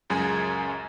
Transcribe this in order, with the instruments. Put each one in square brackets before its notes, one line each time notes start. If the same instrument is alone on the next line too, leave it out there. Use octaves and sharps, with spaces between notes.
[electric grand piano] C#2 F#2 G#3 G#4 G#5 G#6